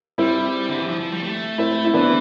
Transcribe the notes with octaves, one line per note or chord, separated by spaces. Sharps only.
G3 C4 E4
D3
E3
F3
F3
G3
A3
C4 E4
E4
E3 B3 D4